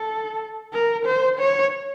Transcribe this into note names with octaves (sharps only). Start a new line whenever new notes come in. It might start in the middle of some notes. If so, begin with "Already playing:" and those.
Already playing: A4
A#4
C5
C#5